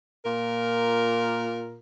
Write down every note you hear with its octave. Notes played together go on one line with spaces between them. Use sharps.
A#2 F4 A#4